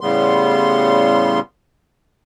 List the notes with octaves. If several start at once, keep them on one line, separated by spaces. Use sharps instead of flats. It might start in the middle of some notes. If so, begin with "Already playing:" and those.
A2 C#3 G3 B3 C6